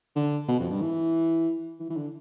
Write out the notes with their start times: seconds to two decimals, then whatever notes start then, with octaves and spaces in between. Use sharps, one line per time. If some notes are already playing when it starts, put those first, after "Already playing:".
0.16 D3
0.48 B2
0.60 F2
0.70 G2
0.81 E3
1.80 E3
1.90 E3
1.97 D3